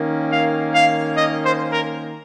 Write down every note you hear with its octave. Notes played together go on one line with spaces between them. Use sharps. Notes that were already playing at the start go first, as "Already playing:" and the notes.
Already playing: D#3 A#3 C#4
F5
F5
D#5
C5
A#4